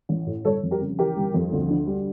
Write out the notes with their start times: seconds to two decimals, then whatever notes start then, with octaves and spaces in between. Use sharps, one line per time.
0.09 A1
0.27 A2
0.45 G1 A4 C#5
0.63 F2
0.71 G4 A#4
0.81 C#3
0.99 E3 G4 A#4
1.16 G1
1.34 F2
1.52 D2
1.70 D3
1.87 G3